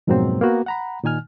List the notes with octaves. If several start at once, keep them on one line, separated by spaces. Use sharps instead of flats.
F2 G#2 B2 F#3 A#3 C4
A#3 B3 F#4
F#5 A#5 B5
A#2 D#3 D#4 G#5 F6